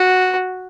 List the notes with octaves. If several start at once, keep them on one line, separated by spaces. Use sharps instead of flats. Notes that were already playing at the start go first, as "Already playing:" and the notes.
Already playing: F#4